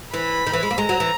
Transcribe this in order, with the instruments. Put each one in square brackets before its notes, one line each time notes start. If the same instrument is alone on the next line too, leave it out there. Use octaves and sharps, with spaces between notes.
[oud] E3 [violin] B5
[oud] D#3
E3
G#3
A#3
[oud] G#3 [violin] A#5
[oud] F#3
E3